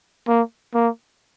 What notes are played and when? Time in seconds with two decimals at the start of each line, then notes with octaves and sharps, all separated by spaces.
0.28 A#3
0.74 A#3